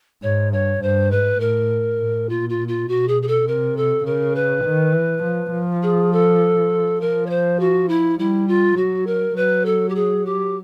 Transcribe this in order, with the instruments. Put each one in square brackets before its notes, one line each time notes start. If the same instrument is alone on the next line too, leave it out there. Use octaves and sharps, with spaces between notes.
[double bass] G#2 [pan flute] C#5
[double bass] G2 [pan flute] C#5
[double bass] G2 [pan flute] C5
[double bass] G#2 [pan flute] B4
[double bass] A2 [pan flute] A#4
[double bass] A2
[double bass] A#2 [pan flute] F4
[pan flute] F4
F4
[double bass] B2 [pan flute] F#4
[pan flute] G#4
G#4
A4
[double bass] C3 [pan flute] A#4
[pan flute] A4
[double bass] C#3 [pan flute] A#4
[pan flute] B4
[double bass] D#3
E3
F3
F3
[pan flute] G#4
A4
[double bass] F3 [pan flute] A#4
[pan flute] C#5
C5
F#4
E4
[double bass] G3 [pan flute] E4
[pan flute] F4
[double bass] F#3 [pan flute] F#4
[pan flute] A#4
[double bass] F#3 [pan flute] B4
[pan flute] A4
G4
G#4
G4